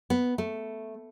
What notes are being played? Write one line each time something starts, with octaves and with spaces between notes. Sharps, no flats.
B3
A3